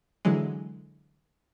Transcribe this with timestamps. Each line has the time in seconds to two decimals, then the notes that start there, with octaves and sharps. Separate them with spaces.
0.25 D3 E3 F#3 G#3